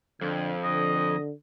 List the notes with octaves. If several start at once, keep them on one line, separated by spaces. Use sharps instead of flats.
F2 D3
D3 D#5